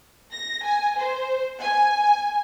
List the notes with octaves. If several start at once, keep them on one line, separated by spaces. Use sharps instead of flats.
A#6
G#5
C5
G#5